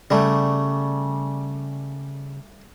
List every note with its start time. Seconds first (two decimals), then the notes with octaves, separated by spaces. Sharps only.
0.10 C#3 G3 A3